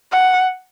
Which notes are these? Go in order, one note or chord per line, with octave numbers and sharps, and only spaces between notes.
F#5